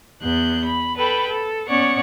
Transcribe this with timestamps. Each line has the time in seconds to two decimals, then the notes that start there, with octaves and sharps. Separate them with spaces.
0.21 E2 B3 F#6 G6
0.65 B5
0.97 A4 B4 G5 B5
1.28 A4
1.67 B3 C#4 C#5 D5 F#5 C#6